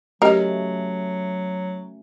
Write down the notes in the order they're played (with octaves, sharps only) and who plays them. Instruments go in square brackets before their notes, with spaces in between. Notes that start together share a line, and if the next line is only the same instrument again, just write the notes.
[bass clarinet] F#3 [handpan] A3 C#4 F#4 [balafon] G4 D#5 [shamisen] A#4